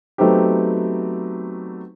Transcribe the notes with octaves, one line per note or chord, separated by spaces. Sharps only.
F#3 A3 B3 C4 D#4 G4